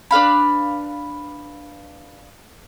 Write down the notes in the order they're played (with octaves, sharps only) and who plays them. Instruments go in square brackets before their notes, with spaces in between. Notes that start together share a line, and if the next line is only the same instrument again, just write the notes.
[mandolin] D4 B4 F5 B5